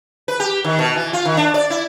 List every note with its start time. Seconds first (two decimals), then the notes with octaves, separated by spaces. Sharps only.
0.28 B4
0.40 G4
0.64 D#3
0.79 B2
0.96 E3
1.13 F4
1.25 D#3
1.37 D4
1.54 D5
1.70 E4